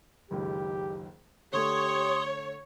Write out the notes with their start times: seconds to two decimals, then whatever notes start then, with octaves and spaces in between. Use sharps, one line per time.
0.31 F#1 C#2 D#3 G4
1.53 D3 A3 G4 C#5 C6 D#6